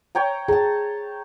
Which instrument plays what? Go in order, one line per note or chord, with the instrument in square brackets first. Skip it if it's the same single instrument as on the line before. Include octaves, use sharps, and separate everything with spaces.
[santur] C#5 G5 A#5
[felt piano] G#4 [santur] A5 A#5